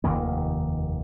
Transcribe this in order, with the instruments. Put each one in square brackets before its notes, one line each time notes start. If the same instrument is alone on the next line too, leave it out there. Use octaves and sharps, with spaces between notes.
[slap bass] F1 D#2 D#3 A#3